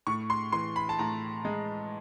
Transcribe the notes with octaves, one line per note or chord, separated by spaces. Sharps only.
A2 C#6
C6
E3 C6
B5
A5
A2 A#5
G#3